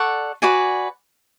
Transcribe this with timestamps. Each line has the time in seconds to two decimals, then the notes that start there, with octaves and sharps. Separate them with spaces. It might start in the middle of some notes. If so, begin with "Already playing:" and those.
Already playing: A4 D5 F#5 C#6
0.42 F#4 B4 D5 G#5